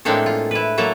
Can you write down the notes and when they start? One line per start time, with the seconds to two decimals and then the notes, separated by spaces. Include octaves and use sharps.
0.05 A2 G#3 A#3 C4 D4 A4
0.26 F4
0.51 E4 B4
0.78 F#3 A#3 A4 E5